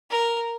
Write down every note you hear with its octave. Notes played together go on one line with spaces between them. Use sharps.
A#4